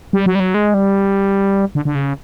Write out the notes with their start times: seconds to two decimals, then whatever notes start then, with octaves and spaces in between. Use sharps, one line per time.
0.13 G3
0.26 F#3
0.35 G3
0.40 F#3
0.54 G#3
0.74 G3
1.75 D3
1.85 D3
1.95 C#3